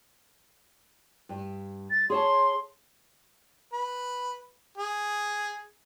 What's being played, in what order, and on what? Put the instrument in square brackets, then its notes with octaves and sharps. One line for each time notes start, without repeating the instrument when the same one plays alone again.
[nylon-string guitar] G2
[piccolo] A6
[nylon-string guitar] G#4 C#5 A5 [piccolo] C6
[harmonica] B4
G#4